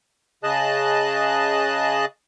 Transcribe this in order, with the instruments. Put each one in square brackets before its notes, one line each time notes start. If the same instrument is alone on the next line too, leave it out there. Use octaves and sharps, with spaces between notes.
[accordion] C#3 G#4 D#5 A5 F#6